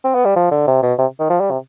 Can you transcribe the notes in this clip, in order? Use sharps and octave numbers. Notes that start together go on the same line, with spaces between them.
C4
B3
G3
F3
D3
C3
B2
C3
D#3
F3
G3
C3